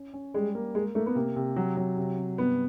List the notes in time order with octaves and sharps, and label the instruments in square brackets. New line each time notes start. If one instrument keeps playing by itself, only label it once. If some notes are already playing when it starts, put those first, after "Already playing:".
Already playing: [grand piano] C#4
C#4
[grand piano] G3 [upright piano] G#3
[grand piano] A#3
[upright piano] G#3 [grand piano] A#3
[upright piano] A3 [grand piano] A#3
[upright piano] B3
[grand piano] C3 [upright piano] A#3
[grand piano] C3
F#3
F#3
C3
C3
[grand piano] G2 [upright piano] B3